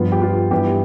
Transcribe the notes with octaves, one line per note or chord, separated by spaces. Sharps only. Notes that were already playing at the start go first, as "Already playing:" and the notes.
Already playing: G2 F3 B3 F4
G4
F4
G2 E3 B3 G4